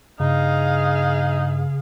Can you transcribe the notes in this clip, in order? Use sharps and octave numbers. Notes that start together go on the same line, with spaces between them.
G2 C#3 D#4 G#4 F5